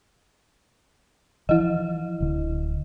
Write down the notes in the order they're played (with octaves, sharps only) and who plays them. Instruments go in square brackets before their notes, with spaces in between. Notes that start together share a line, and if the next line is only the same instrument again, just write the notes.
[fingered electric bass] E3 F3 [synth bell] E4 D#5
[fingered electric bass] D1 D3